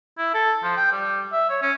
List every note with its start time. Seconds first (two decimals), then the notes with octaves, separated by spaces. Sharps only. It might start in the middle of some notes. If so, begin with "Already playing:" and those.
0.18 E4
0.34 A4
0.63 F3
0.77 G5
0.92 G3
1.32 E5
1.50 C#5
1.62 C#4